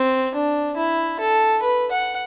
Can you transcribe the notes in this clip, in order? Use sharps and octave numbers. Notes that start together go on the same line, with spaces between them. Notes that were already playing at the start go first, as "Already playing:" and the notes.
Already playing: C4
D4
E4
A4
B4
F#5